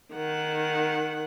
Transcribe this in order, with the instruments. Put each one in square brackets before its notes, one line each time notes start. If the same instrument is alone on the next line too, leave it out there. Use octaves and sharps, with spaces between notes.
[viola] D#3 F#5